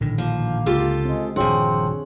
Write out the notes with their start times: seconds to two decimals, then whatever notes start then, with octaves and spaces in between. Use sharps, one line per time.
0.01 A#1 A2 D3 D#3
0.18 F3 A#3
0.66 C#2 F4 G4 A4
1.05 G#3 C4
1.36 D#1 G2 F3 C4 D4 F#4 G#4 C#5